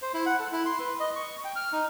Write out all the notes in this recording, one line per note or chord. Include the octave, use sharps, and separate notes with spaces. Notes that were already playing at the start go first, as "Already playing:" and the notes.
C5
E4
F#5
A4
E4
C6
B4
D#5
C#6
G5
F6
D#4